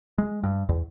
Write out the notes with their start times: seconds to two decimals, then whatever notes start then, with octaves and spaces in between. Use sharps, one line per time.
0.18 G#3
0.44 G2
0.69 E2